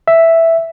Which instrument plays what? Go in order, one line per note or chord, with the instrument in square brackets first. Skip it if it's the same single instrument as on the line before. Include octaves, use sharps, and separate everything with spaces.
[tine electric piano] E5